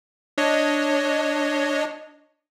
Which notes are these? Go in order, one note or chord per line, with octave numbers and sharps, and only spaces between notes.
D4 C#5 D#5